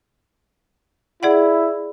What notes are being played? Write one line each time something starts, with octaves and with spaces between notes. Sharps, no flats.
E4 G#4 D5 F#5